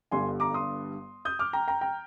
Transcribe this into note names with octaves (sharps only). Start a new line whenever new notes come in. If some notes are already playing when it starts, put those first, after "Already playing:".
G1 G2 D3 G3 G#5 C6
A#5 D6
C6 D#6
D#6 G6
D6 F6
G5 A#5
G5 A#5
G5 A#5